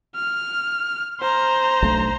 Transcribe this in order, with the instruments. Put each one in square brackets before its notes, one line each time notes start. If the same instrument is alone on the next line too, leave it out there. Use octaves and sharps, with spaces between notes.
[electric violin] F6
C5 A#5
[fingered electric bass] B1 A3 D4